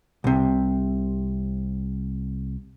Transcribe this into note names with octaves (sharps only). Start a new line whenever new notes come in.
C2 C3